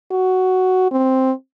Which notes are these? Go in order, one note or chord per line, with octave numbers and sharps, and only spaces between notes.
F#4
C4